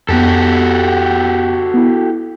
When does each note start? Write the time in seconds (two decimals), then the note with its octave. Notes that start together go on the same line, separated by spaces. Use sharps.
0.09 F2 B3 F#4 G4 A4
1.74 B3 E4